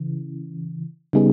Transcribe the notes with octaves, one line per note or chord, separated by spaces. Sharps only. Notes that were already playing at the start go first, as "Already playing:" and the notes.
Already playing: C#3 E3
C#3 G3 B3 D#4 G#4